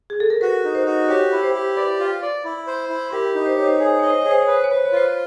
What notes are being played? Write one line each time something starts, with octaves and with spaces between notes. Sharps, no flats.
G#4
A4
A#4
F#4 B4
D#4
C5
F#4
G4 C#5
E4
C5
G4
B4 D5
F4
D5
E4
C5
E4
G4 A#4
D#4
C5
D#4 C#5
C5
G#4 C#5
C5
C#5 D#5
C5
G#4 C#5
C5
B4 C#5
C5
C#5
B4 C5
C#5
F4 C5